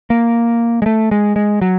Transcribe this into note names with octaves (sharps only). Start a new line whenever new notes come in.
A#3
G#3
A3
G#3
G#3
F#3